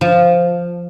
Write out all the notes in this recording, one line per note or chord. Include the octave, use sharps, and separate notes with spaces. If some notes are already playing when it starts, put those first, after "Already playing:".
F3